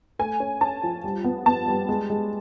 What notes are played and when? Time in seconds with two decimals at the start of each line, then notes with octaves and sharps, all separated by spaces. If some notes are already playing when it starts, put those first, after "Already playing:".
0.19 A3 G#5
0.40 C#4
0.61 C#4 A5
0.83 F3
1.04 G3
1.24 B3
1.46 B3 A5
1.68 G3
1.89 G#3
2.10 G#3